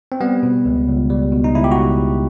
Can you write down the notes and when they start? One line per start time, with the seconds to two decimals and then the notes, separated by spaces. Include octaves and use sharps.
0.12 C4
0.21 G3 B3
0.43 B2
0.66 C#2
0.88 C#2
1.10 G3
1.32 B2
1.44 D#4
1.55 C#2 E4
1.64 G4
1.71 F#4